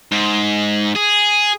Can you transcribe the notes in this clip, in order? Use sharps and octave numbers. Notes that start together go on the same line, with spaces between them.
G#2
G#4